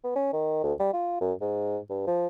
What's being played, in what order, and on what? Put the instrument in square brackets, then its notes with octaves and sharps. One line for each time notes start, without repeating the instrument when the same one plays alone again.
[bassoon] B3
C#4
D#3
D2
G3
F4
F#2
G#2
G2
F3